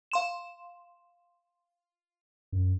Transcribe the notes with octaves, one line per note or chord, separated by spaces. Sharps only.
F5 C6 E7
F#2